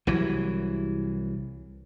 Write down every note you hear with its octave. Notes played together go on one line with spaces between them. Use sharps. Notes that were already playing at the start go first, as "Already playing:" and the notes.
C2 E3 F#3